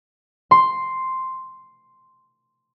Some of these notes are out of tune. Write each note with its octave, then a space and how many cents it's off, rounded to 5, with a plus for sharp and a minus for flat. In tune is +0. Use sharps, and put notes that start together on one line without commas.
C6 +0